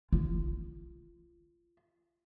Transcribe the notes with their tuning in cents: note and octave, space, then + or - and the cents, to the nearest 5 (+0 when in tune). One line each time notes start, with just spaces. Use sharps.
F4 -25